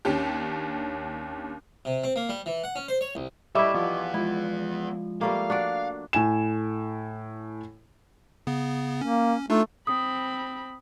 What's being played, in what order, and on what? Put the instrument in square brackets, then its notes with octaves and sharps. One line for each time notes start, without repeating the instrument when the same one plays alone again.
[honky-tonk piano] D#2 C#4 D4 G4
[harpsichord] C3
C4
A#3
G3
E3
F#5
C#4
C5
C#5
C2
[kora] G3 E4 [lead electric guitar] A4 B5 [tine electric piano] D#5 C#6 D6 [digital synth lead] E5
[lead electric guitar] E2 B3 [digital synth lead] F3
[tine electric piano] G#3 F4 [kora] E4
[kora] G3 A3 A#3 [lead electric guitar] F5
[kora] D4 F#4 D5
[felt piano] A2 G#5 E7
[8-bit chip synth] C#3 B3
[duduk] A#3 [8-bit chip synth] C#4
[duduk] A3 [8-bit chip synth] D4 D#4 F4
[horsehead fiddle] C4 B5 [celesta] D#6